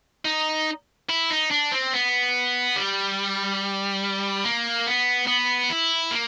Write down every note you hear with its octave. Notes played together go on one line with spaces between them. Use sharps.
D#4
E4
D#4
D4
C4
B3
G3
A#3
B3
B3
E4
A#3